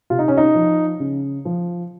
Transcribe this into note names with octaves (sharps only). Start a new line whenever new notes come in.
C3 F4
D#4
C#4
D#4
F3
C#3
F3